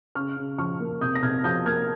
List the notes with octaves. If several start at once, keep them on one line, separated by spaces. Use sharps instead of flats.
C#3 C#6 F6
C#3
F3 C#6 F6
A#3
C3 D#6 G6
A#6
C3 F6 G#6
F3 D#6 G6
A#3 F6 G#6